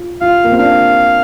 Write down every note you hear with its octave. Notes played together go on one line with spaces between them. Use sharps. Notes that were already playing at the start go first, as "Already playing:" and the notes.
Already playing: F4
F4 F5
A#3
C4
D4 F5